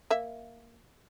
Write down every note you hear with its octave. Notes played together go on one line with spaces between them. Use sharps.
A#3 E5